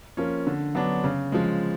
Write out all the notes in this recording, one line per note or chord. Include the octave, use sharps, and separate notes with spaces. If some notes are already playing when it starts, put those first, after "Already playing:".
F3 A#3 C#4
D3
F#3 B3 D4
C#3
F3 G#3